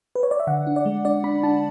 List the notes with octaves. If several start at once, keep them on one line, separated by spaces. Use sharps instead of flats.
B4
C#5
D5
E5
D3 F#5
D4
D5
G#3
D4 D5
D4 B5
D4 A5